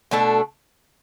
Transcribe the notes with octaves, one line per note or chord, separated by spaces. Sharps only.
B2 A3 D4 A4